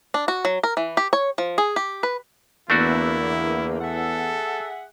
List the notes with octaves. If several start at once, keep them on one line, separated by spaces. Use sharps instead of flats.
D4
F#4
F#3
A#4
E3
G4
C#5
F3
G#4
G4
B4
E2 D3 E3 A3 A#3 D4 E4 F#4
G#4 A4 E5 F#5